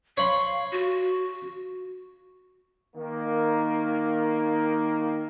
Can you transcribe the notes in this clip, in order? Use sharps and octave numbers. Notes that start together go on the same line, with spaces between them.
C#5 F5 B5 C6
F#4
D#3 A#3